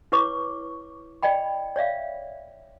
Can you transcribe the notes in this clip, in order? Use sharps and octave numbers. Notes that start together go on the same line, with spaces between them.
E4 B4 C#5 C#6 D6
D5 D#5 G5 B5
C#5 D5 E5 F5